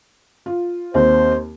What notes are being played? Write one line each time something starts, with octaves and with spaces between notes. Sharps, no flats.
F4
D#2 C4 C5